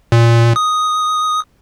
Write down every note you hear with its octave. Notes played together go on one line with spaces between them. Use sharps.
A#2
D#6